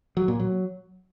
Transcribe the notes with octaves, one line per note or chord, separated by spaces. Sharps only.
F#3
A#2
F#3